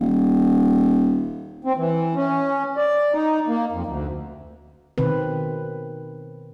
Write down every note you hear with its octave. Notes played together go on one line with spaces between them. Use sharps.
D#1
C4
E3
C#4
D5
D#4
A#3
F2
D2
B2 D#3 C4 B4